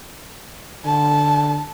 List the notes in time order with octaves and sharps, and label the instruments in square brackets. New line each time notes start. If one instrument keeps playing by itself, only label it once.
[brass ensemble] D3 [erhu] A5